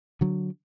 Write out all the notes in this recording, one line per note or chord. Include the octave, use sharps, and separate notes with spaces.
D3 F#3